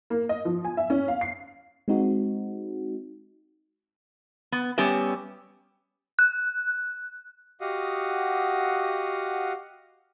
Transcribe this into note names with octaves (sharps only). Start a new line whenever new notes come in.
A#3
D#5
F3
G#5
E5
C#4
F5
C7
G#3 C4 D#4 F#4
B3
G3 B3 C#4 G4 E5
F#6
F#4 G4 D#5 F5 F#5 D#6